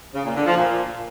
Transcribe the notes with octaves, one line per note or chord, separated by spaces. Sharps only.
C#3
A#2
D3
F3
A#2